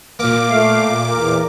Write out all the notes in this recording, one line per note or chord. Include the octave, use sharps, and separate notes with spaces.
A#2 A#3 D6
A3 F5
E2 A#4